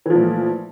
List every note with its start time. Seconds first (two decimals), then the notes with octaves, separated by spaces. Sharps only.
0.06 E3
0.10 F3
0.15 A#2
0.19 A3